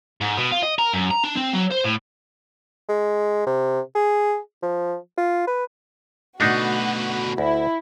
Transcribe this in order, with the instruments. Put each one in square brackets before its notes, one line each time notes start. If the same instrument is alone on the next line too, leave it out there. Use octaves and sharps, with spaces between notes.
[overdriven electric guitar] G#2
B2
F4
D#5
A#4
F#2
A#5
D4
C4
F#3
C5
A2
[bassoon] G#3
C3
G#4
F3
F4
B4
[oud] B2 A3 [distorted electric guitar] D3 B4 [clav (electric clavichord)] D4 D#4 [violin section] F#4
[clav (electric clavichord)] D2 [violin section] E4